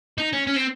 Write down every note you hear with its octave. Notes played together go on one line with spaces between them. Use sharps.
D#4
C#4
C#4
C4